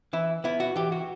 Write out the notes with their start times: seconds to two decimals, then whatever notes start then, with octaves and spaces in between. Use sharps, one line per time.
0.13 E3 E4
0.44 B3 E4
0.60 F#4
0.76 E3 G4
0.92 F#4